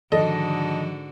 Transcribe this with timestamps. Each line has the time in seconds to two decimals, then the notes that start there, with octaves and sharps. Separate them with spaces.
0.12 G#2 D3 D#3 F3 F#4 A4 D#5